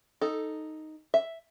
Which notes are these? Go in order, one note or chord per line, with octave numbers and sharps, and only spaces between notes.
D#4 A4
E5